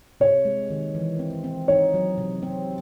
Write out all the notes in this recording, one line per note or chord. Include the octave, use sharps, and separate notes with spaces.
C3 C#5
G#3
D#3
E3
C4
C4
D#4 C#5
F#3
C3
C4